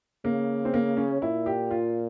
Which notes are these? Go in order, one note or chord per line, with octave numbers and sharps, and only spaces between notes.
C#3 A#3
C4
A#3
C#4
A#2 E4
G4
F4